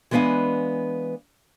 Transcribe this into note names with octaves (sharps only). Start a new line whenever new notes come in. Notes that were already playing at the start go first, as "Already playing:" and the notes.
E3 G#3 B3 D4 F5 G#5